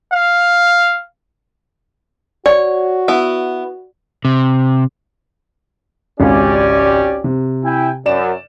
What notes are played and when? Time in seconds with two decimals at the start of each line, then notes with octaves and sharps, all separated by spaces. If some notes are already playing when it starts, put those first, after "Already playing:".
0.12 F5
2.46 F#4 C#5 D5
3.08 B3 E4
4.25 C3
6.20 G#1 C#2 C#4 G4 D5 F5
7.24 C3
7.64 E4 G5 G#5
8.06 F#2 D5 E7